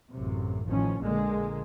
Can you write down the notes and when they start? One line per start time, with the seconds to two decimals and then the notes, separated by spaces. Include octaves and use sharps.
0.12 A1 F#2 C3
0.67 A1 D#3 F3 C#4
1.00 A#1 A#2 D3 G#3 A#3